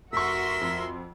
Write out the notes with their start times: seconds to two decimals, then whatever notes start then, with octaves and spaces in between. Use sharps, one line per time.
0.13 F1 F#4 A#4 E5 C6 C#6 E6 B6
0.61 F2